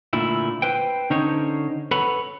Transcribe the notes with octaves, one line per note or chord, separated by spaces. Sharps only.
A#2 D3 A3 E4
B4 C5 G5
D3 C#4 D#4 C5 C#5
A4 B4 C#5 F#5 B5